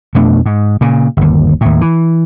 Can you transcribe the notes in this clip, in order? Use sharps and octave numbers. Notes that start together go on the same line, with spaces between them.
F2 B2 A3 D4
G#2
A#2 C#3
G1 D#2
D#2 A2
E3